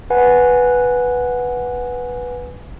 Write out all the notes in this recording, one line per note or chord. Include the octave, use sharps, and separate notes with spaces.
B4 F#5 G#5